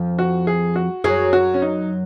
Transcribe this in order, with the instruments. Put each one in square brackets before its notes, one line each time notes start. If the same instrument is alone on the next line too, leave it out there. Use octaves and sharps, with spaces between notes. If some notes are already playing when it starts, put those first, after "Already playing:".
Already playing: [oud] F2 F3
[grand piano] F#4
G#4
F#4
[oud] F#2 F#3 [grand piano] G#4
[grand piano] F#4
C#4
D#4